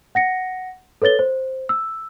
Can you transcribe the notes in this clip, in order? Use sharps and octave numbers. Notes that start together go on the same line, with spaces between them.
F#5 A#6 C#7
A4 B4 C#5 A6 G7
C5
E6